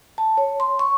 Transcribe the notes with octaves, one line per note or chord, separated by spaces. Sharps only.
A5
C#5
C6
C#6